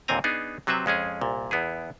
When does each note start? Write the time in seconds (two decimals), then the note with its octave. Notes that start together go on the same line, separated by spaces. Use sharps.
0.08 D#2 A#2 D3 C4 G#5 A#5
0.24 B3 D4 D#4 G#4
0.67 C3 F#3 C4 B4 E5
0.86 F2 G#3 C#4 G#4
1.21 C2 A#2
1.51 E2 B3 E4 G#4